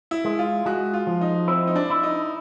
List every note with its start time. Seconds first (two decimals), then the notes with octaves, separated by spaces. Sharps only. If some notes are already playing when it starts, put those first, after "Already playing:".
0.11 E4
0.25 G#3
0.39 F4
0.66 G#3 F#4
0.93 F4
1.07 F3
1.21 D#4
1.48 C4 E4
1.67 D#4
1.76 D4
1.90 E4
2.03 D#4